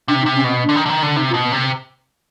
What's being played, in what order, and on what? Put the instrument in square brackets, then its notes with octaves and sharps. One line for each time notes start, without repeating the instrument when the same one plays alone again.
[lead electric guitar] C3 [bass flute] D4
[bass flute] D#4
[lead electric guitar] C3
[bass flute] C#4
[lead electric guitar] B2 [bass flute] C4
[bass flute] D4
[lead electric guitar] D3
D#3
D3
D#3
D3
[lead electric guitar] C3 [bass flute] D#4
[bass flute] F4
[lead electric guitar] B2
[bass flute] B3
[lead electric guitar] C3 [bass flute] A#3